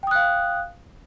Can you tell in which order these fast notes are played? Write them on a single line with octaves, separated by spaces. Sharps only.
G5 D#6 F#6 F5